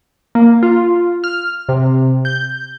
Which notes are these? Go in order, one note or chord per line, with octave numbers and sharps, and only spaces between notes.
A#3
F4
F6
C3
G6